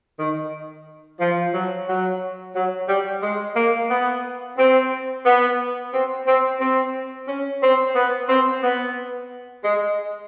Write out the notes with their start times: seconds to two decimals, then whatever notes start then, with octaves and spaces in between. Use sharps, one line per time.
0.19 D#3
1.20 F3
1.54 F#3
1.88 F#3
2.55 F#3
2.89 G3
3.22 G#3
3.56 A#3
3.90 B3
4.58 C4
5.25 B3
5.94 C4
6.27 C4
6.61 C4
7.28 C#4
7.62 C4
7.95 B3
8.29 C4
8.63 B3
9.64 G#3